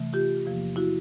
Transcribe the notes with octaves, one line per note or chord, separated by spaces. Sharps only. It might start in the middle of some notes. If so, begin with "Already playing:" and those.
Already playing: C3 E3 A3
F4 G4
E2 C3 F3 A#3
E4 F#4